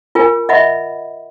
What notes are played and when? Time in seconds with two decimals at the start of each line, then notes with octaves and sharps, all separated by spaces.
0.15 F4 A#4 G#5
0.49 D#5 E5 F#5 B5